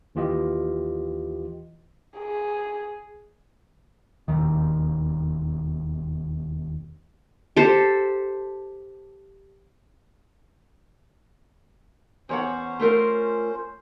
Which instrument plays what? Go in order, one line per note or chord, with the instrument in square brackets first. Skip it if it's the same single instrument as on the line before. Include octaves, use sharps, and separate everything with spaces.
[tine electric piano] D#2 E3 F4 G4 D#5
[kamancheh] G#4
[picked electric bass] E1 A#1 D#2 D#3
[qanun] G4 A4 C5
[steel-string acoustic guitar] E2 C#5 F#5 [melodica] C#4 C5
[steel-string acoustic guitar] A3 F4 A#4